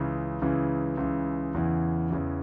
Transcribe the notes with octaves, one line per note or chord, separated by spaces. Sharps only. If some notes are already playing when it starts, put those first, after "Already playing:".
Already playing: C#2 C#3 E3
C#2 C#3 E3
C#2 C#3 E3
E2 C#3 E3
E2 C#3 E3